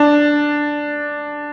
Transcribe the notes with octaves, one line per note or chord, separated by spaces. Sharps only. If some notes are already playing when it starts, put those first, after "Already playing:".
Already playing: D4